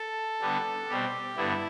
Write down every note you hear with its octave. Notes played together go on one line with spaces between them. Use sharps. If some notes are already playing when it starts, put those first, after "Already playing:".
Already playing: A4
D3 G3 B3 D4
B2 G3 C4 G4
G2 D3 G3 B3 E4